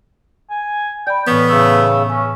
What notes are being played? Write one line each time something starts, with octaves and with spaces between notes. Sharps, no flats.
G#5
D5 G5 B5
A2 E3 B3 C#4
C#3 A3 E6
C#4 G#5